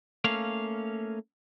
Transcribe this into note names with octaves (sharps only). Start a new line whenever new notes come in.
A3 A#3 C#4 F5